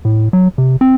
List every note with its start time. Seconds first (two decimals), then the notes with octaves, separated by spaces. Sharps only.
0.05 A2
0.33 F#3
0.58 C3
0.81 C4